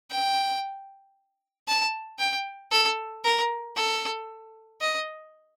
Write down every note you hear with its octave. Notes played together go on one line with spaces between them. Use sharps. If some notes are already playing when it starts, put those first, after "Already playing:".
G5
A5
G5
A4
A#4
A4
D#5